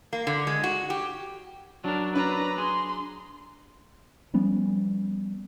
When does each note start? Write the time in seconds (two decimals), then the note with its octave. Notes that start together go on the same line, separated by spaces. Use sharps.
0.13 A#3
0.27 D3
0.47 G#3
0.63 F#4
0.90 G4
1.84 F#3 D4 A#4
2.16 D4 B4 A#5
2.58 G#4 C6
4.34 F3 G3 B3 C#4